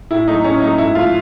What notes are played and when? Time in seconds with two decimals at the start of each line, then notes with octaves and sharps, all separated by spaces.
0.11 A2 E4
0.28 F#3 A3 D#4
0.44 A2 C#4
0.61 F#3 A3 D#4
0.78 G#2 E4
0.95 F3 A3 F4